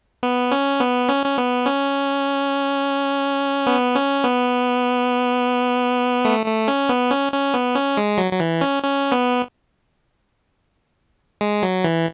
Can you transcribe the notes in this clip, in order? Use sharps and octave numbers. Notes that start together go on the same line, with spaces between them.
B3
C#4
B3
C#4
C#4
B3
C#4
B3
C#4
B3
A3
A3
C#4
B3
C#4
C#4
B3
C#4
G#3
F#3
F#3
E3
C#4
C#4
B3
G#3
F#3
E3